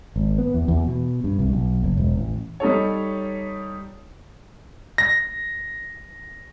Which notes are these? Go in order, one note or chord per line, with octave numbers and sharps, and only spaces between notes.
G#1
B3
E2
E2
B2
G2
C2
B1
F#1
E1
A1
G3 D#4 A4 C#5
A#6